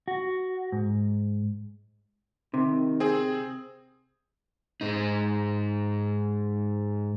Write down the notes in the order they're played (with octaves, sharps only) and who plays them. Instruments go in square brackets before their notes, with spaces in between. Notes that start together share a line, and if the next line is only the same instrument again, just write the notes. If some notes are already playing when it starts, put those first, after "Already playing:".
[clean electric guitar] F#4
G#2
[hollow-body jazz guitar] C3 [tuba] D#3
[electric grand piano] C4 G#4
[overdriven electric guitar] G#2 D#4